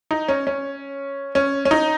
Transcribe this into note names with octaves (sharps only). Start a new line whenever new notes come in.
D#4
C#4
C#4
C#4
C#4
D#4